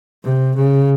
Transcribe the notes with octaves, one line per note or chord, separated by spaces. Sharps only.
C3
C#3